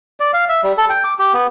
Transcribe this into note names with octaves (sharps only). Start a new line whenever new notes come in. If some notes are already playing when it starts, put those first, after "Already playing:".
D5
F5
E5
G3
A4
G5
D6
G4
B3